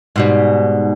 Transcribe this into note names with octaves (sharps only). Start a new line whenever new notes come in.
G#2 B2 G3